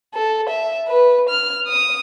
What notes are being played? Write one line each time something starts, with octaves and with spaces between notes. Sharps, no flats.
A4
E5
B4
F6
D#6